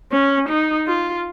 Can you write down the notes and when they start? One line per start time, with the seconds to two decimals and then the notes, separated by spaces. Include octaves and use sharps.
0.11 C#4
0.49 D#4
0.87 F4